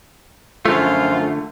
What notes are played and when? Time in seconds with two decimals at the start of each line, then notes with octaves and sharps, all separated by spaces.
0.66 F#2 D3 F3 A3 F4